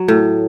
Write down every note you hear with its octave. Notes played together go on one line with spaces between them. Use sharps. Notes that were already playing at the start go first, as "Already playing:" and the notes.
Already playing: F#3
A2